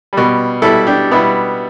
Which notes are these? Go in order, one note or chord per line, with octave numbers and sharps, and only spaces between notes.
B2 G3
B2 G3 E4 A4
D4 G4
B2 G3 B3 E4